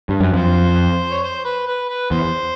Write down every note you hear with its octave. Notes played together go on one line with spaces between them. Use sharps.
G2
F#2
F2 C5
C#5
C5
B4
B4
B4
E2 C5